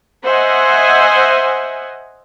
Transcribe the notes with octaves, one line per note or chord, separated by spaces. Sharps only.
C5 D#5 E5 F#5 G#5